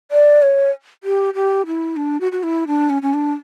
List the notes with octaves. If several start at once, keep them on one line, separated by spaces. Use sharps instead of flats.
D5
C#5
G4
G4
E4
D4
F#4
F#4
E4
D4
C#4
C#4
D4